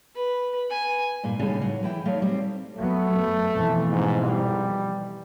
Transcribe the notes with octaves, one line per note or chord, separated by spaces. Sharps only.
B4
G#5
G2 A#2 A#3
D#2 A2 C#3 G3 C#4 D4
F#3
E3 E4 G5
E2 F#3 A3 D#4 C#5 F5
G3 C4
F#3 A3 B3
F#2
F2 B2 E3
G#2
G3